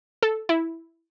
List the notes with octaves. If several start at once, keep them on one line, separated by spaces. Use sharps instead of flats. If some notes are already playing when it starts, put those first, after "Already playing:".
A4
E4